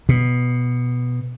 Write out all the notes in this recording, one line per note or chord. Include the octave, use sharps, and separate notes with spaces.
B2